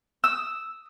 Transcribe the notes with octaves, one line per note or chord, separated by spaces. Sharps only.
D#6 E6